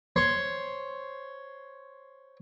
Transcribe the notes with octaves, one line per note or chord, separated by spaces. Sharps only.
C5 C#5 C6